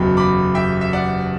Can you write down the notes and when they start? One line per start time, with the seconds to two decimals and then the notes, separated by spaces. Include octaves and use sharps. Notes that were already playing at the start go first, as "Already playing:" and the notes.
Already playing: F#1 E2 B2 F#3 G5 B5
0.17 B5 D6
0.55 E5 G5
0.81 E5
0.93 D5 F#5